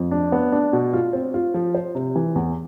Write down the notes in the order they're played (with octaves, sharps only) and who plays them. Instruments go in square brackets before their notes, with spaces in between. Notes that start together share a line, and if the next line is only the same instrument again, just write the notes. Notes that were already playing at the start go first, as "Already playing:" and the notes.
Already playing: [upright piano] F2
D4
B3
D4
B2
F4
C4
F4
F3
C5
C3
E3
E2